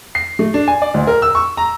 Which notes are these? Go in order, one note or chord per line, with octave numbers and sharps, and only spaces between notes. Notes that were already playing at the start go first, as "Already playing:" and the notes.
C7
A3
D4
G#5
D5
D2
A#4
E6
C#6
A#5